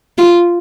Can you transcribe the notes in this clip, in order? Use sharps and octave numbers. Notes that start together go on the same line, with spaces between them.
F4